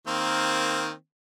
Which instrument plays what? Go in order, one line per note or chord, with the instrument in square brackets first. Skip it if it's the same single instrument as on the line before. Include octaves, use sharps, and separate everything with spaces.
[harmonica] D#3 A#3 C4